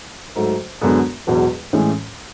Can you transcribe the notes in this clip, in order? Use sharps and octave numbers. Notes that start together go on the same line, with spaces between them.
G#2 F#3 A3
F#2 D3 G#3 B3
E1 E2 B2 F#3
A2 E3 G#3 C#4